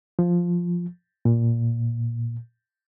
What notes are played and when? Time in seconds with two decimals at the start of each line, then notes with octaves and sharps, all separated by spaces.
0.19 F3
1.25 A#2